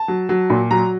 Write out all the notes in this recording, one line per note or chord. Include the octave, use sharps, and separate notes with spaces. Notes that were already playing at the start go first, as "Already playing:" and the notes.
Already playing: A5
F#3
F#3
A#2
F#3 A#5